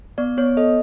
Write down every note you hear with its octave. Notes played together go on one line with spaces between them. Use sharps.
B3 D5
B3 C#5
A4 D#5